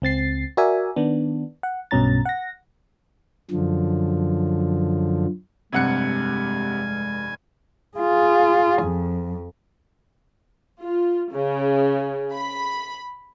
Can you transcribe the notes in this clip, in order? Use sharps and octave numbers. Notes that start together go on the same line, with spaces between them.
C#2 C4 A6 C7
F#4 A#4 D5 E5 G#5
D#3 B3 D4
F#5
B1 G2 B2 C#4 A#5 A6
F#5 A#6
F#2 D3 F3
F1 G2 C3 G#3 F#5 G#5 F#6 C#7
F4 G#4
F2
F4
C#3
B5